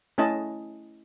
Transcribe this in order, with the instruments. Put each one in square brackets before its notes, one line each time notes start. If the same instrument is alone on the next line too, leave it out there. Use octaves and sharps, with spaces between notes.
[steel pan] A3 C#4 E4 D#5 G#5 A5